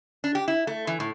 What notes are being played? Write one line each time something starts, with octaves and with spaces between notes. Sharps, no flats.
D4
G4
E4
A3
E3
A2